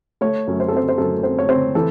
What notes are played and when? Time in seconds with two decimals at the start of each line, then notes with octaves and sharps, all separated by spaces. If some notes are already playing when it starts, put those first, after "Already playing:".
0.21 A3 C#5
0.47 F#2
0.60 C5
0.68 A4
0.72 C4 C5
0.89 C5
0.98 F#2 A4
1.23 C4 C5
1.39 C#5
1.49 C4 C5
1.75 E3 A4